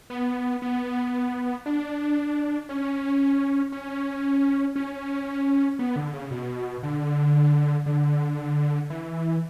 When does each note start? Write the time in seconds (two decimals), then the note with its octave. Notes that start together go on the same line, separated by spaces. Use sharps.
0.10 B3
0.62 B3
1.66 D4
2.69 C#4
3.72 C#4
4.76 C#4
5.79 B3
5.96 D3
6.13 C#3
6.31 B2
6.83 D3
7.86 D3
8.90 E3